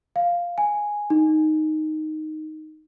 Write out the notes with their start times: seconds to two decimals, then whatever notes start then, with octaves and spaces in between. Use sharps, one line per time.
0.16 F5
0.58 G#5
1.10 D#4